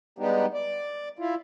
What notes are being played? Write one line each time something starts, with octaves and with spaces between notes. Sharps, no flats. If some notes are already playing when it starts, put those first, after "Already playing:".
G3 G#3 B3 D4 D#4 G4
D5
E4 F4